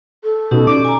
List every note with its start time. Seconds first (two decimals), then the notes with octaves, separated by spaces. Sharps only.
0.24 A4
0.51 B2 C#4 D#4 G4
0.67 C#4 D5 D6
0.85 G#5 A#5